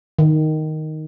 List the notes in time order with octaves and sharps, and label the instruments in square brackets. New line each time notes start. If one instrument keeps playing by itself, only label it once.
[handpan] D#3